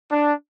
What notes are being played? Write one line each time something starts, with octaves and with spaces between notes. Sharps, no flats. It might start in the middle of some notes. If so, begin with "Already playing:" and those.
D4